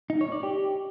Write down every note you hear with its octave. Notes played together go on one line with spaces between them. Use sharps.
D#4
C#5
D5
G4